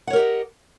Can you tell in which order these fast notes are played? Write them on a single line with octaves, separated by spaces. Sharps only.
F#5 C#5 A#4 G4 D#5